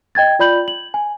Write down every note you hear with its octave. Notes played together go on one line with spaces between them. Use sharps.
D#5 G5 G#6 A6
F4 D5 B5 G6 F#7
F#7
G#5